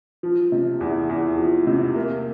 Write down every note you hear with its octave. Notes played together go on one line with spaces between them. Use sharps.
F3
C3
E2
E2
F3
C3
A#3